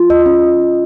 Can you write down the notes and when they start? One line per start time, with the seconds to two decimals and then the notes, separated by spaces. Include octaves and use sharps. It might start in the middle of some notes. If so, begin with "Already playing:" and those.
Already playing: F4
0.10 D#5
0.26 C#4